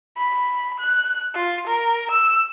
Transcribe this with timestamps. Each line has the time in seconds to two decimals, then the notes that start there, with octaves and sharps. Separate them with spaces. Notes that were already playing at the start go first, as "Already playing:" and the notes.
0.17 B5
0.79 F#6
1.35 F4
1.67 A#4
2.11 E6